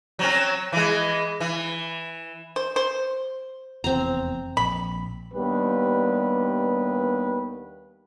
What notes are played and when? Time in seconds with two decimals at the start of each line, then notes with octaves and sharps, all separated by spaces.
0.19 F#3 C4 C#4
0.73 E3 G#3
1.40 E3
2.56 C5
2.76 C5
3.84 F1 E2 C4 A#5
4.57 A#1 B5
5.34 D#2 G3 B3 D4 G4 B4